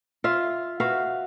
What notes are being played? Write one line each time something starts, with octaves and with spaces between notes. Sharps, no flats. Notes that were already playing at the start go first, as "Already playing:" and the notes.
F4 E5 F5
F#4 B4 E5 F5